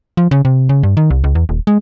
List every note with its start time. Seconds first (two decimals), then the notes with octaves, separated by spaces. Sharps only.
0.17 F3
0.31 C#3
0.45 C3
0.69 C#3
0.83 G2
0.97 D#3
1.10 C2
1.24 C#2
1.35 E2
1.49 D#1
1.67 G#3